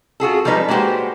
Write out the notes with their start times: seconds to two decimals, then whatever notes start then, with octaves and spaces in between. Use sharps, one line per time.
0.20 F4 F#4 G#4 A4
0.45 F3 G3 G#3 D#4 B4
0.69 G#3 A#3 F#4 G4 B4 C5